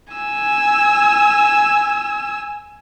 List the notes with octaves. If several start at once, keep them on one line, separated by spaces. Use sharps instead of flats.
G#5 E6